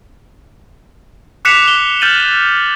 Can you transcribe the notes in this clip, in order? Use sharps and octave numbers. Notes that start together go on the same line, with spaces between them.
D6 F#6 B6 C#7 E7 F7
G7
F6 G6 A6 D#7 F#7